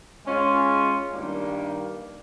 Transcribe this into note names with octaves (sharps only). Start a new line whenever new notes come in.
G#3 C#4 F4
G2 D#3 G3 A#3